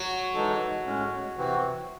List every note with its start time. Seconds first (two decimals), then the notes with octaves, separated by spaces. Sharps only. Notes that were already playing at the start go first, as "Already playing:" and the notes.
Already playing: F#3
0.34 E3 G#3 D#4 A4
0.86 A2 G#3 C#4
1.37 C3 E3 C4 F#4